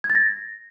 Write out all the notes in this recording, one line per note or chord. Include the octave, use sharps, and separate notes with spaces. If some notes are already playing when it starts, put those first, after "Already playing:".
G#6
A6
A#6